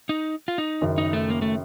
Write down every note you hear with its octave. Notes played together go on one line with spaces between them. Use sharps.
D#4
F4
D#4
F#1 F#2 D#3
D#4
A3
A#3
A3